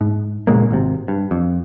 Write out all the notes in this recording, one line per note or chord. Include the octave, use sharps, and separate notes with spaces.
G#2
C#2 A#2 G#3 A#3
G#1 C3
G2
F2